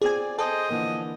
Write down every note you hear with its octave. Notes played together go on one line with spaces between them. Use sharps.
C4 F4 G#4 D5 G#5
G#4 A4 C5 D#5 G5
D3 E3 F3 A#3